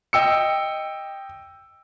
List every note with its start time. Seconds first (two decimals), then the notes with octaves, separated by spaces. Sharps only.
0.13 D#5 G5 E6 C#7